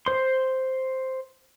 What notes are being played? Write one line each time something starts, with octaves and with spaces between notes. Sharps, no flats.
C5 C6